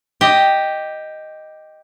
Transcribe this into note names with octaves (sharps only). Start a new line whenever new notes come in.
G4 D#5